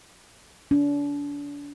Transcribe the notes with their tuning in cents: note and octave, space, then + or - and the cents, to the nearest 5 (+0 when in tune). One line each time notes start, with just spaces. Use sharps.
D4 -35